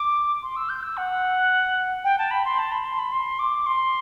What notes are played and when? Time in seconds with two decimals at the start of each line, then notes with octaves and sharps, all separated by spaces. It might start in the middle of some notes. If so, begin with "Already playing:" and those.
Already playing: D6
0.42 C6
0.56 E6
0.69 G6
0.83 E6
0.97 F#5
2.04 G5
2.18 A5
2.31 B5
2.45 C6
2.59 A5
2.72 B5
2.85 C6
2.99 B5
3.12 C6
3.39 D6
3.66 C6